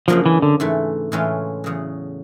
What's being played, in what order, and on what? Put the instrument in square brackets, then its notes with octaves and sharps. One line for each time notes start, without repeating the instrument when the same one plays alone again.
[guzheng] F#2 C#3 F#3 A#3 D4 [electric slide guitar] F3
[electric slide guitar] E3
D3
[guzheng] G#2 E3 A3
A2 E3 G#3 C#4 F4
E2 C#3 F#3